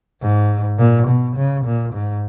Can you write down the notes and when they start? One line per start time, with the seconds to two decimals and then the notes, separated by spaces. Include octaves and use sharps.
0.22 G#2
0.79 A#2
1.07 B2
1.36 C#3
1.65 A#2
1.94 G#2